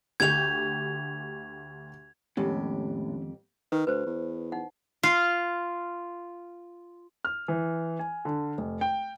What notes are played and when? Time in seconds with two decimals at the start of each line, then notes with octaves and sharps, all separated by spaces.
0.20 D2 G4 G6 G#6 F7
2.37 F2 A2 D#3 G#3 B3 C#4 G4
3.72 D#3 B4
3.87 D2 B4 C5
4.06 E2
4.52 D#4 F#5
5.03 F4 F5
7.25 F6
7.48 E3
7.99 G#5
8.25 D3
8.58 F1
8.81 G5